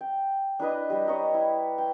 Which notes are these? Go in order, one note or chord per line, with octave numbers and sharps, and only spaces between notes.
G5
D4 E4 B4 D#5
G3 G4
B4 C#5 D#5 A#5
E4
G5